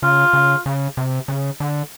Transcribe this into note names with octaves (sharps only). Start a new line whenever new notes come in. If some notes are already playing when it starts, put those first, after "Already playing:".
C#3 F4
C#3
C#3
C3
C#3
D3